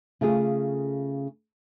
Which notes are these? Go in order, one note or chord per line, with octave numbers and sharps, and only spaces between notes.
C#3 A3 F4 G#4